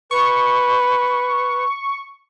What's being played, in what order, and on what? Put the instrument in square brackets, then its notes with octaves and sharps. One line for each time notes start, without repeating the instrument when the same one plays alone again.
[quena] B4 [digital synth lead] C#6